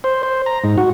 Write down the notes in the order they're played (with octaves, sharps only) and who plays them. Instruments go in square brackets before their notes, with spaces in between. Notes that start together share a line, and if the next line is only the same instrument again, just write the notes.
[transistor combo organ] C5
C5
A#5
G#2
F#4